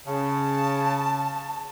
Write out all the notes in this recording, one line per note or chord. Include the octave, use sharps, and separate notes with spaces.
C#3 A5